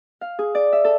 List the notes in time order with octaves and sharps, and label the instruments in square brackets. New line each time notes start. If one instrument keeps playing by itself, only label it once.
[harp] F5
G#4
D5
E5
A4